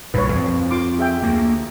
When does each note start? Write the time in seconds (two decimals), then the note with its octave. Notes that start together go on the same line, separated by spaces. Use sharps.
0.14 B1 G2 A#2 B4 C#5
0.32 F2 F3 C4
0.71 F4 C6 D6
0.99 G#4 E5 G5
1.22 D2 A#3